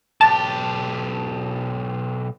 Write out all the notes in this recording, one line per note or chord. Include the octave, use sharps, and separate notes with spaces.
B1 G4 A5